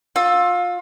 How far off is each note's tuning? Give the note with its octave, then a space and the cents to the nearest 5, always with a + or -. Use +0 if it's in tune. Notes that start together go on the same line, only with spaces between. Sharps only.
F4 +25 E6 +0